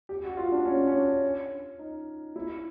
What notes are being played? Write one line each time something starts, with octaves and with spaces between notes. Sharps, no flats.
G4
F#4
F4
D4
C#4
C#4
D4
D#4
E4